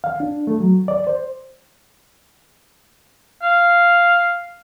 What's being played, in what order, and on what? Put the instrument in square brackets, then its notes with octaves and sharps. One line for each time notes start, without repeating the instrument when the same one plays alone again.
[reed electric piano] F5
D4
A3
F#3
D5
C5
[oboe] F5